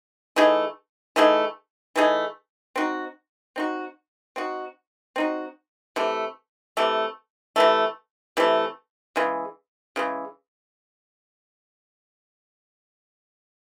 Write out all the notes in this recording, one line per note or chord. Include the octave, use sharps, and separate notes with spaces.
E3 A3 D#4 G#4
E3 A3 D#4 G#4
E3 A3 D#4 G#4
C4 D#4 F#4
C4 D#4 F#4
C4 D#4 F#4
C4 D#4 F#4
C3 E3 A3
C3 E3 A3
C3 E3 A3
C3 E3 A3
C#3 E3 G#3
C#3 E3 G#3